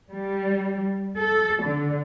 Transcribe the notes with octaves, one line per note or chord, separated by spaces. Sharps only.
G3
A4
D3